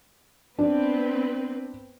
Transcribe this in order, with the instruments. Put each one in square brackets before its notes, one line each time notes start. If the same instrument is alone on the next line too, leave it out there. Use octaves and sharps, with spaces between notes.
[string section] B3 C4 B4 [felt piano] D4